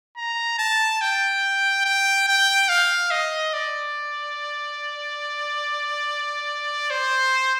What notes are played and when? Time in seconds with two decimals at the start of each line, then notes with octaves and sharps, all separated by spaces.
0.17 A#5
0.59 A5
1.01 G5
1.85 G5
2.28 G5
2.69 F5
3.11 D#5
3.53 D5
6.90 C5